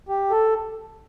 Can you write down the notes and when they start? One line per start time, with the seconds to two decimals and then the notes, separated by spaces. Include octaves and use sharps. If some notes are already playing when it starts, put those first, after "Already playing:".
0.09 G4
0.31 A4